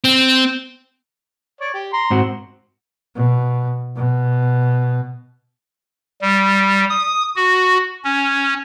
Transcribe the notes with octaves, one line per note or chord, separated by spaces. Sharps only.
C4
C#5 D5
G4
A#5 C6
G#2 C4 F#4
B2
B2
G3
D#6
F#4
C#4